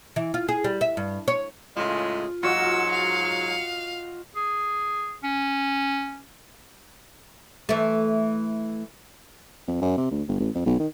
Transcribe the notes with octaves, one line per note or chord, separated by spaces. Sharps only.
E3
F4
G#4
G3
E5
G2
C#5
A2 C#3 G#3 F4
G#2 F#3 F4 F#4 D#5 E6 C#7
F5
G#4
C#4
E3 A3
F2
F#2
C3
D2
G1
A1
F2
B1
D#3